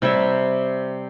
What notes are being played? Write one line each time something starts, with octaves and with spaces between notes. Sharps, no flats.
C3 G3 C#5 E5